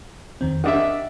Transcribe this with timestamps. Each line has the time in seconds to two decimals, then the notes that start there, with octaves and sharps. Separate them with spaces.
0.41 F2 D#3 C4
0.64 D#3 D4 G4 D#5 E5 F#5